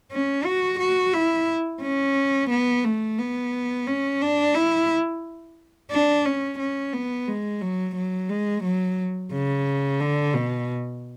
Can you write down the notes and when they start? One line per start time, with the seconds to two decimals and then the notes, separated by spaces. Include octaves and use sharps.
0.12 C#4
0.45 F#4
0.80 F#4
1.13 E4
1.82 C#4
2.50 B3
2.84 A3
3.19 B3
3.87 C#4
4.21 D4
4.55 E4
5.91 D4
6.25 C#4
6.59 C#4
6.93 B3
7.27 G#3
7.61 F#3
7.96 F#3
8.29 G#3
8.64 F#3
9.32 C#3
10.00 D3
10.34 B2